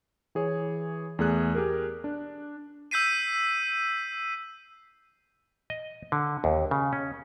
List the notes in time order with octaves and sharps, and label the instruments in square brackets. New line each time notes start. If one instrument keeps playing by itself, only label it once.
[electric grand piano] E3 G#4 C#5
E2 A3 G#4 F#6
G4 G#4 A#4
D4
[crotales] E6 G6 B6 C7 D#7
[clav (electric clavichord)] D#5
D3
D#2
C#3
C#4